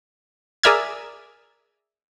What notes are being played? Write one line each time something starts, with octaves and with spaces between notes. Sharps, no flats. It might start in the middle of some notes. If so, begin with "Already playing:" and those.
G#4 A#4 D5 E5 F6 G#6